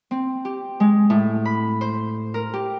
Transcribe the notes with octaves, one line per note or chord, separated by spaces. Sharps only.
C4
G4
G#3
A2
B5
C5
A#4
G4